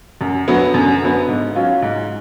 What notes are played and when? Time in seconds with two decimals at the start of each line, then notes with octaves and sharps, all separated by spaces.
0.21 F#2
0.47 D3 F#3 B3
0.74 F#2
1.01 D3 F#3 B3
1.28 G#2
1.55 F#3 C#4 F4
1.82 G#2